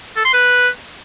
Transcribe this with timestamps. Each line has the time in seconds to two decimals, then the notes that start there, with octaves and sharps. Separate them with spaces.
0.16 A4
0.25 C6
0.34 B4